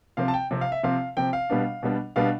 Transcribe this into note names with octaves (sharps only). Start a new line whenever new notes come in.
C3 F3 C4 F5
A5
G5
C3 F3 C4
F5
E5
C3 F3 C4 F5
C3 F3 C4 G5
F5
B2 G3 B3 D4
B2 G3 B3 D4
B2 G3 B3 D4 F5